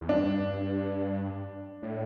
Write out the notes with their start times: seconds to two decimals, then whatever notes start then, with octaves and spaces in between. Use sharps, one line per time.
0.01 E2
0.09 G2 D4
1.82 A2